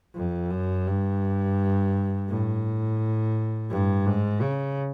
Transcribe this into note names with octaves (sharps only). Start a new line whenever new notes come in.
F2
F#2
G2
A2
G2
G#2
C#3